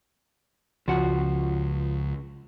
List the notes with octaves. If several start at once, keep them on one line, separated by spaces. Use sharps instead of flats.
C#2 F3 F#4